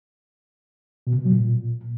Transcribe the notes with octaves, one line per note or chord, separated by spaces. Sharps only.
B2
C#3
B2
F#3
A#2